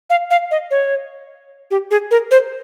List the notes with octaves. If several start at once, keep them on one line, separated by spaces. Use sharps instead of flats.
F5
F5
D#5
C#5
G4
G#4
A#4
C5